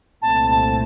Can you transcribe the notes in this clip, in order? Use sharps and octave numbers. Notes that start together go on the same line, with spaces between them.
C2 A#2 A3 C4 A5
A5